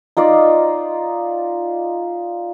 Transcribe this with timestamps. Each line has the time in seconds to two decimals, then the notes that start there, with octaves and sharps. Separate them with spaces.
0.17 D#4 F4 D5